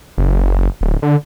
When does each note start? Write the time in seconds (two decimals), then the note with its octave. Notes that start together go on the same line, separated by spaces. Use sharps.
0.18 F#1
0.81 D1
1.02 D3